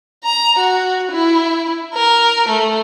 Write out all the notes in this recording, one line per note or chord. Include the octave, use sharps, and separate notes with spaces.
A#5
F#4
E4
A#4
A3